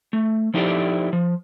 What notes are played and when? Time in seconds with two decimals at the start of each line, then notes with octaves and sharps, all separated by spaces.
0.13 A3
0.54 F3 D#4 E4 G4 A4 D5
1.13 F3